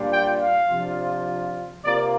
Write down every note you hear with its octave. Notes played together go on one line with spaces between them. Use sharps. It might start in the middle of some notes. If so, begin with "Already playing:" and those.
Already playing: A#2 G3 D4 F4
G5
F5
C3 F3 D4 F4
C3 A#3 F4 D5